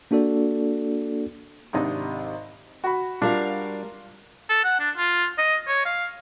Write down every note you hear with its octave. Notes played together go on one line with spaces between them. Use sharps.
A#3 D4 F#4 A4 D5
G#1 C3 D4 D#4 D#5
F#4 B5
G3 D4 F4 A#4 F5
A4
F#5
D4
F4
D#5
C#5
F5